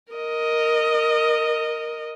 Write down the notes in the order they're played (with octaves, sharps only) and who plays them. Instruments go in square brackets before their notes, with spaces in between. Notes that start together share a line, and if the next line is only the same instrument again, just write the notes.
[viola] A#4 D#5